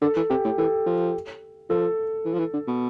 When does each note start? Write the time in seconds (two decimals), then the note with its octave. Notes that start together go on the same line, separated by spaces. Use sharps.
0.02 D3 A4
0.16 E3
0.30 C3 G4
0.45 A2
0.58 E3 A4
0.87 F3
1.70 F3 A4
2.25 E3
2.34 F3
2.39 E3
2.54 D3
2.68 B2